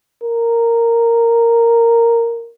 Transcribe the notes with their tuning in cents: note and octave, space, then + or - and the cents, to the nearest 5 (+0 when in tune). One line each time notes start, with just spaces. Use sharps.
A#4 -10